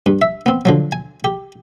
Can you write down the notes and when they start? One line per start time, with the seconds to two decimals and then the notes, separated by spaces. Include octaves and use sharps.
0.06 G2
0.22 E5
0.46 B3 C4
0.65 D3 F3 F#3
0.92 G#5
1.24 G4